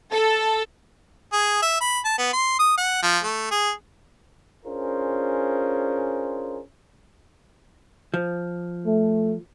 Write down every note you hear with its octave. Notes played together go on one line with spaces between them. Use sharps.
A4
G#4
E5
B5
A5
B3
C6
D#6
F#5
F3
A3
G#4
C#4 D4 F4 G#4 A#4 C5
F3
A3